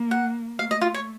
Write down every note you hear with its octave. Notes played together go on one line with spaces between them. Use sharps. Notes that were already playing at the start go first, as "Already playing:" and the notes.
Already playing: A#3
F#5
A3 F5
D#5
F4
C#5